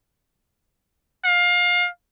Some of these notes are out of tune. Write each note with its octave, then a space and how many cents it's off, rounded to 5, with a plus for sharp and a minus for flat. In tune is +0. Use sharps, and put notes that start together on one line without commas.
F5 +25